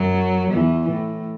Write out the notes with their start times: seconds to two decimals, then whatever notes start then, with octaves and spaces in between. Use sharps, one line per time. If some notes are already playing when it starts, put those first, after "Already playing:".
Already playing: F#2 F#3
0.52 E2 E3
0.90 A2